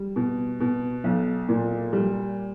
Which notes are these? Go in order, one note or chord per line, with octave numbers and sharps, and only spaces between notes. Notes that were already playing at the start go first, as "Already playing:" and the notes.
Already playing: G3
B2
B2
B1
A#2
G3